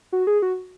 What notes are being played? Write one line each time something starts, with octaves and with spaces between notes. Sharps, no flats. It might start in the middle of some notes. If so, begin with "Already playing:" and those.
F#4
G#4
F#4